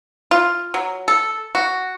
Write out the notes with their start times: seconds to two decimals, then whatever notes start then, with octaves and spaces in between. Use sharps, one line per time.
0.31 F4
0.74 F#3
1.08 A4
1.55 F#4